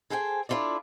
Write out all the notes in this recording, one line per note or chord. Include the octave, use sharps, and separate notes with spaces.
G#4 A4 C5 G5 G#5
D4 E4 F4 A4 D5